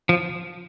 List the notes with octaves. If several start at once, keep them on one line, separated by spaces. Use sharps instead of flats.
F3